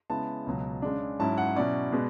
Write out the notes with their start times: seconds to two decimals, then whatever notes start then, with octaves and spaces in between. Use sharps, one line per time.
0.10 C#3 G#3 B3 E4 A5
0.47 C#2 B2 F#3
0.82 C#3 G#3 D4
1.19 G#2 F#3 C#4 E4 A5
1.38 F#5
1.56 B2 F#3 C#4 E4 D5
1.92 B2 G#3 B3